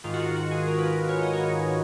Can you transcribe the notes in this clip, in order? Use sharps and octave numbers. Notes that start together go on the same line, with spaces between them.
G#2 D#3 F4
F#4
F4
F#4
G#4
A#4
B4
A#4
C#5
D#5
C#5